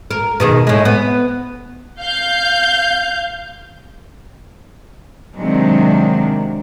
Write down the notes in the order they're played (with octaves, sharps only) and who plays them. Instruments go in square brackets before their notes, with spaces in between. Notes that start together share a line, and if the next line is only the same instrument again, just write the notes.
[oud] A#4
B2 D#3 G#4
A2 G#3
B3
[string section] F5 G6
[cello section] C3 D#3 F#3 G#3 A#3 D4